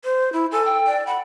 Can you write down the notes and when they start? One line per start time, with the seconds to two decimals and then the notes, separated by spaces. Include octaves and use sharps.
0.05 C5
0.33 E4
0.52 A4 G#5
0.65 G5
0.87 D5
1.07 F#5 B5